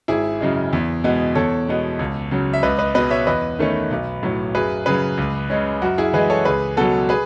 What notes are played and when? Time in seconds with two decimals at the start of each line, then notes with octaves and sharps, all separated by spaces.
0.08 G#1 E4 G#4
0.41 F#2 C#3 G#3
0.73 E2
1.04 B2 G#3 B3
1.35 E2 A4 C#5
1.68 B2 G#3 B3
1.99 C#2
2.31 C#3 F#3
2.53 E5
2.63 C#2 B4 D#5
2.79 B4 D#5
2.95 B2 G#3 B4 D#5
3.11 C#5 E5
3.27 E2 B4 D#5
3.59 D#3 A3 C#4
3.91 B1
4.23 A2 F#3
4.54 F#2 G#4 B4
4.86 C#3 F#3 G#4 B4
5.18 C#2
5.50 C#3 G#3 C#4
5.82 F#2 F#4
5.98 E4 G#4
6.13 E3 G#3 G#4 B4
6.30 A4 C#5
6.45 C#2 G#4 B4
6.77 B2 F#3 F#4 A4
7.09 G#4 B4